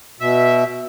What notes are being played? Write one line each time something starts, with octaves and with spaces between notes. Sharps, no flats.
B2 E5